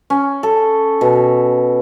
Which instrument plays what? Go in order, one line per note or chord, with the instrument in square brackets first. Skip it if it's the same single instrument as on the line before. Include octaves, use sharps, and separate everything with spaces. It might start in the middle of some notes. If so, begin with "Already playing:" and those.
[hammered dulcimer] C#4
A4
B2